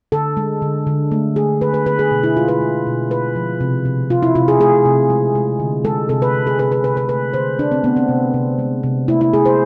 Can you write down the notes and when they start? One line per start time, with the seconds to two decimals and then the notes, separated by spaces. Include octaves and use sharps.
0.12 D3 A4
0.37 G#3
0.62 D3
0.87 D3
1.12 A3
1.36 A3 G#4
1.61 D3 B4
1.74 B4
1.86 D3 B4
1.99 G#4
2.11 B2
2.23 E4
2.37 G#3 F4
2.48 B4
2.61 G#3
2.86 B2
3.11 G#3 B4
3.36 F3
3.60 C3
3.85 C3
4.10 C3 F4
4.22 E4
4.35 C3 F4
4.48 G#4
4.60 A3 G#4
4.85 C3
5.10 G#3
5.35 G#3
5.60 D3
5.85 G#3 A4
6.09 C3 A4
6.22 B4
6.35 C3
6.47 G#4
6.59 C3 B4
6.72 B4
6.84 C3 B4
6.97 B4
7.09 A3 B4
7.34 D3 C5
7.59 D3 D4
7.72 C4
7.84 A3 B3
7.97 C4
8.09 C3
8.34 C3
8.59 G#3
8.83 C3
9.08 A3 E4
9.21 E4
9.33 A3 G#4
9.46 C5